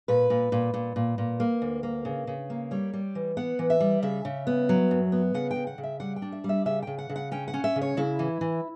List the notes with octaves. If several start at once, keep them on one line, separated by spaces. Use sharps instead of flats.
A#2 B4
A#2
A#2
A#2
A#2
A#2
A#3
D2
A#3
C#3
C#3
A#3
G3 C#5
G3
E3
B3 F#5
E3
E5
G3
C#3 E5
C#3
B3
F#3
F#2
B3
C#3 F#5
G5
C#3
F#5
C#3
E5
G3 F#5
G5
D4
E5
G3 E5
C#3 E5
C#3 G5
F#5
C#3
F#5
C#4 G5
F#5
C#4
E5
C#3
C#5
C#3 E4
E3
E3